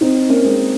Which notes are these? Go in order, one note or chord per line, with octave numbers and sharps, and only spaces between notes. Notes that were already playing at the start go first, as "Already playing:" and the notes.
C4 D#4
A#3 C#4
G#3 C4